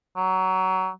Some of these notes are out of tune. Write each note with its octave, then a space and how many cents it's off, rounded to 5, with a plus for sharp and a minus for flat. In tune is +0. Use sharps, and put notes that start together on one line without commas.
F#3 +20